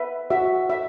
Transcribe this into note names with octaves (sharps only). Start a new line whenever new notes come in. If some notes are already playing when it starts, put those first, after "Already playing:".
Already playing: B4 E5
F#4 E5
E5